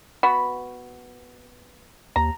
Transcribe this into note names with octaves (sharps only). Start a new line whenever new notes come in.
B3 F#4 B5
D#2 A#5